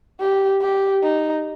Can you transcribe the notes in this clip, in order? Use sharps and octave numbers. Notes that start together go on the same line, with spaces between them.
G4
G4
D#4